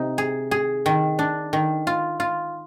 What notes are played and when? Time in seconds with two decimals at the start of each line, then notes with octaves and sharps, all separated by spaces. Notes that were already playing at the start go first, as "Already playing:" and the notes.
Already playing: C3 D#4
0.18 G#4
0.51 G#4
0.86 D#3
1.19 D4
1.53 D#3
1.87 F4
2.20 F4